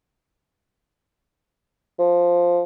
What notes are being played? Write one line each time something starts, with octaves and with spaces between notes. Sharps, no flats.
F3